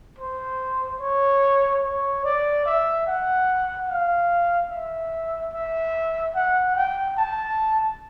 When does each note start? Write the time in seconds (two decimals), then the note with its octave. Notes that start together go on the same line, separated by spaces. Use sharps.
0.18 C5
1.00 C#5
1.83 C#5
2.24 D5
2.66 E5
3.07 F#5
3.88 F5
4.70 E5
5.53 E5
6.35 F#5
6.75 G5
7.17 A5